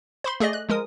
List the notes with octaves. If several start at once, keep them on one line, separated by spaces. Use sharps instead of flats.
C5 B5 C6
A3 G#4 D5 D#5
F#6
F3 G#3 A#4 D#6